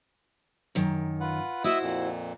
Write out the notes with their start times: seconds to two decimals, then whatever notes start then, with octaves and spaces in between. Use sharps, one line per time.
0.75 F#2 D#3
1.20 F4 B4 F#5
1.64 E4 F#4 C5 D#5 E5
1.82 F2 A#2